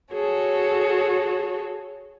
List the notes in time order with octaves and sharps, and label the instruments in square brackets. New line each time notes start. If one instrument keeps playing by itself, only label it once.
[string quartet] F#4 G#4 A4 C#5